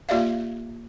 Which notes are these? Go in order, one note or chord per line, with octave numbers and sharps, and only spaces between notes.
A#3 F4 G4 D5 E5 F5